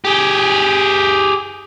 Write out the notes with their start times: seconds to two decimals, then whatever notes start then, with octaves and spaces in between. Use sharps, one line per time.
0.05 G4 G#4